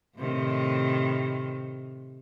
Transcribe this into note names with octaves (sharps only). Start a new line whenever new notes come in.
A2 C3 D#3